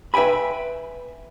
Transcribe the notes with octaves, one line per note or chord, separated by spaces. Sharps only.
B4 E5 G5 G#5 B5